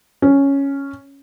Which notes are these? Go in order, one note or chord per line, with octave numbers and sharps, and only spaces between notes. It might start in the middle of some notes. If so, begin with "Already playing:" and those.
C#4